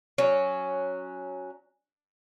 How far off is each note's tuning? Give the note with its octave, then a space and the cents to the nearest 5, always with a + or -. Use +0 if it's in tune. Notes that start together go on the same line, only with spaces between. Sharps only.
F#3 -5 C#4 +0